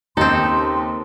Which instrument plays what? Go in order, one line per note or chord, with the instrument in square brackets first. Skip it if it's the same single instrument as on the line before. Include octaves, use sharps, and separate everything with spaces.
[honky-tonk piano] D#2 C#3 [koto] C4 A4 [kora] D#4 [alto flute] C6